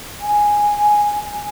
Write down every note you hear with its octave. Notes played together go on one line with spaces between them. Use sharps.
G#5